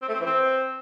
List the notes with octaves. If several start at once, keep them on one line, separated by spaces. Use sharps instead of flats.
C4
A3
C4
E3
C4